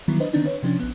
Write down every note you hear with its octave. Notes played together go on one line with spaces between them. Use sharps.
D#3 E3 F#3 G3 B3 E4
D4 B4 C5 D#5
D3 D#3 B3 C4 D4 D#4
B4 C#5
C3 F3 C#4 D4
A#1 B3